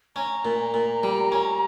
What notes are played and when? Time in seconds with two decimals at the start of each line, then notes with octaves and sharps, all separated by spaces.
0.16 C#4 A#5
0.45 A#2
0.74 A#2
1.03 G3
1.32 C#4